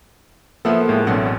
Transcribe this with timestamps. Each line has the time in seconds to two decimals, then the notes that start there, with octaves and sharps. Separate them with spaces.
0.65 F3 A#3 B3 A4 E5 F#5
0.87 A2 G#3
1.07 A1 B2 F#3 C4 D4 F#5